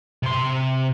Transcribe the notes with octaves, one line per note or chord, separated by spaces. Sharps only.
C3 C6